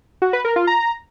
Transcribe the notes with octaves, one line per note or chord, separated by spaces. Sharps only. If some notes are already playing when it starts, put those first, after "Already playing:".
F#4
B4
A#4
F4
A#5